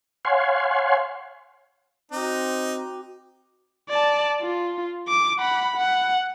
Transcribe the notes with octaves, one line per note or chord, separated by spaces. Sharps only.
C#5 F5 F#5 G#5 C6
C4 D#4 F#4 G5 D6
D5 A5
F4
D6
F#5 B5
F#5